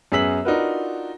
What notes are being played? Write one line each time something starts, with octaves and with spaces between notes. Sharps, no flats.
F#2 B3 G#4 E6 B6 F#7
D4 D#4 F4 F#4 A#4 B4